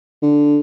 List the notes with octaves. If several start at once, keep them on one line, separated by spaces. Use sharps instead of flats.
D3